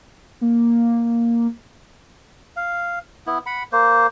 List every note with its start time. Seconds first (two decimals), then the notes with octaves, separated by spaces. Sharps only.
0.41 A#3
2.57 F5
3.27 B3 E4
3.46 F#5 B5
3.72 A#3 C5